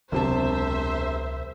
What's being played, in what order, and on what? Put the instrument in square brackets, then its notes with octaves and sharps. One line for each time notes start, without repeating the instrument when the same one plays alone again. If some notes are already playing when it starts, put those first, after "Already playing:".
[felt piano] E1 C3 A5 [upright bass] C#2 F#3 [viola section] C5 E5